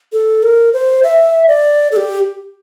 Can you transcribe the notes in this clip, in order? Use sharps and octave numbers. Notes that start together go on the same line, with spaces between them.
A4
A#4
C5
E5
D5
A4
G4